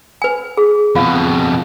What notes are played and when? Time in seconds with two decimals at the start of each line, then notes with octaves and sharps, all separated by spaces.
0.22 B4 G#5
0.57 G#4
0.95 F2 B2 F4 F5